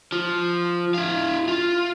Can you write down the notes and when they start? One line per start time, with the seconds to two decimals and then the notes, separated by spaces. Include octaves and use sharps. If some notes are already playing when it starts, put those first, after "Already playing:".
0.12 F3
0.94 E4 F5
1.48 F4